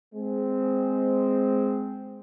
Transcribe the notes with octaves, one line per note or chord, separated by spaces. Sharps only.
G#3 C4